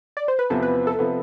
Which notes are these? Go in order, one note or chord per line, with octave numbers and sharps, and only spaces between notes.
D5
C5
B4
E2 C3 F3 B3 A4
B4
A4
C3 F3 B3